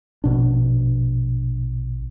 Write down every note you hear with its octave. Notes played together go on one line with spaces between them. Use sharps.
A#1 B2 D4